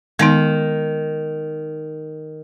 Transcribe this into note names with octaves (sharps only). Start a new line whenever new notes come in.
D#3 G#3 B3 D#4